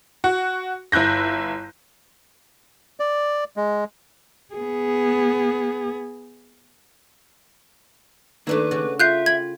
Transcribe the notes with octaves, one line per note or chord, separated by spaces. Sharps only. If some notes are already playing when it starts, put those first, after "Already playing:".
F#4
G1 E4 F#6 G6 A#6
D5
G#3
B3 G#4
D#3 A3 A#3 D4 E4 B4
C#3 F#4 D5
F4 E5 F#6 G6 C7
G5 B5 G#6